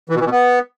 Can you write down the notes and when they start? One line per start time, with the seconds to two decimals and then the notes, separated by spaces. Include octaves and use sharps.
0.10 E3
0.15 B2
0.20 E3
0.26 B2
0.31 B3